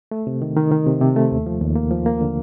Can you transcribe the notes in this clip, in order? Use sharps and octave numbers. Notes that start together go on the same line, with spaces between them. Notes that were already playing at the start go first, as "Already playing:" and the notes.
A3
C3
D#3
D#3
D#3
C3
C3
A3
D#2
F3
D#2
A#3
F3
A#3
D3